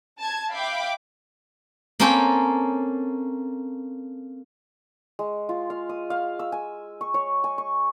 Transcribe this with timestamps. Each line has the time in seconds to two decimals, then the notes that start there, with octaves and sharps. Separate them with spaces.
0.20 A5 G#6
0.51 E5 F5 G5 B5 D6
2.00 A#3 C4 C#4 A4 G5
5.19 G#3
5.49 F4
5.70 F5
5.89 D#6
6.10 F5
6.39 E6
6.52 G#5
7.01 C#6
7.14 C#5
7.44 G#5
7.58 C#6